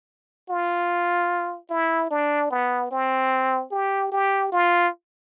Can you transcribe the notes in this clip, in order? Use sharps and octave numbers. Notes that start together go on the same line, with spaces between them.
F4
E4
D4
B3
C4
G4
G4
F4